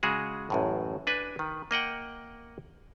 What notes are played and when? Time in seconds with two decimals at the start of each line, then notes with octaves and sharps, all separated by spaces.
0.03 C#3 G#3 F#4 G#4
0.50 A1 F#2 A2
1.07 D4 B4 G#5
1.39 D#3
1.71 A#3 D#5 F#5 G5